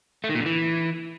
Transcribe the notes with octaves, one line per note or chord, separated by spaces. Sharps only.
A3
D#3
A#2
D3
E3